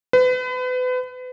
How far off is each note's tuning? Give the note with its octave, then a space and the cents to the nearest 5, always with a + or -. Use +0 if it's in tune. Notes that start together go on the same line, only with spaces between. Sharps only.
B4 +35